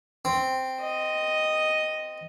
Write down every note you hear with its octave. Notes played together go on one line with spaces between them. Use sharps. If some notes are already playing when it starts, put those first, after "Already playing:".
C4
D#5